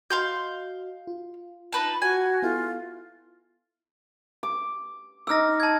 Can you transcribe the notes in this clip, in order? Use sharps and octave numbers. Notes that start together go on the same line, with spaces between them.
F#4 D#5 F5 C6 G6
F4
D#4 B4 A5
F#4 G#5
B3 E4 F4 A4
D6
D#4 D6 E6 F6 A#6
A5 G#6